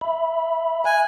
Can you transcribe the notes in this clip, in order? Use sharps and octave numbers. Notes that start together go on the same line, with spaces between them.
E5 B5
E5 G#5 F#6